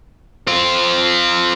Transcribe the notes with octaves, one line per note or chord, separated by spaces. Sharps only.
C4 F4